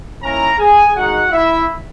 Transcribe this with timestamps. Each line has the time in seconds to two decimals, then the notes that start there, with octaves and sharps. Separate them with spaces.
0.23 D#3 A#3 C#4 E4 A#4 A#5
0.59 G#4 G#5
0.95 D#3 G#3 D#4 F#4 F#5
1.32 E4 E5